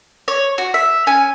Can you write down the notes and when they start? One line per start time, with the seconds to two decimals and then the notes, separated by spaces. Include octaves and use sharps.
0.28 C#5
0.58 F#4
0.74 E5
1.07 C#4 G#5